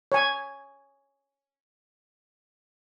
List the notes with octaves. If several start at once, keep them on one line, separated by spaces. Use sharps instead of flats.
C#5 G#5